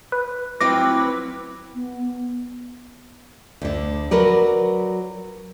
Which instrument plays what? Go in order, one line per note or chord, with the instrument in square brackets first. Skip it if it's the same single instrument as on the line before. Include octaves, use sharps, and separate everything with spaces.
[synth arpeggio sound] B4
[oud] F#3 C4 F4 [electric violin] E4 B4 [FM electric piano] D6 [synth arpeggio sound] A#6
[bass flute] B3
[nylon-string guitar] D2 D3
F#3 A#4 B4 D5